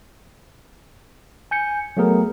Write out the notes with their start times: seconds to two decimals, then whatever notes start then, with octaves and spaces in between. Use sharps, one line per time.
1.51 G#5 G6 C#7
1.97 F#3 A3 B3 G#4 A#4